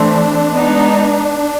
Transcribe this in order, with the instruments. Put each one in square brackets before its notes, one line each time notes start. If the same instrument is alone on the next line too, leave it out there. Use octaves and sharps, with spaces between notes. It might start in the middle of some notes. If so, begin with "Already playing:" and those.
Already playing: [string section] E3 A3 C4 [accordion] D4
[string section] G#3 B3 D#4